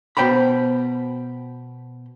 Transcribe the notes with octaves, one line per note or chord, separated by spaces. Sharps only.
B2 C5 G5 A#5 B5